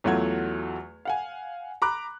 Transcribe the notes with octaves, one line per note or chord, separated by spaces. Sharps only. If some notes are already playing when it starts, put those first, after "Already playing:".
E2 F#3 A3 F4 F#5 G#6
F5 F#5 G#5
A#5 B5 D6 F#6